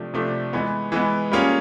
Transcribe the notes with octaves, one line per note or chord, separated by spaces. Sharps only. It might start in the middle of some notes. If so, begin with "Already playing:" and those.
Already playing: C3 F3 A3 D4
C3 F3 A3 D4
E3 G#3 B3
E3 G#3 B3
G3 A#3 C#4 F4 G#4